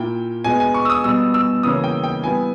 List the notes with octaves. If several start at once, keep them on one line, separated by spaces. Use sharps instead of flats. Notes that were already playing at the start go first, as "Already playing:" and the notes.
Already playing: A#2 A#3 E4 G5
B2 G#3 B3 G#5
G#5
C#6
E6
D#6
B2 G3 B3 E6
E6
C#3 E3 A#3 C#4 D#6
G5
G5
G3 B3 E4 G#5